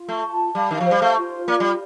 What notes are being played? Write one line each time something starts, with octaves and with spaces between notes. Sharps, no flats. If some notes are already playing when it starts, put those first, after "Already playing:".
Already playing: F4
A3
A5
G3 F5
D#3
F3
C5
G3
A3
F4
A#3 D5
G3